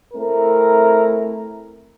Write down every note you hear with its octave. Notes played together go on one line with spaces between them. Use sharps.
A3 C4 E4 A#4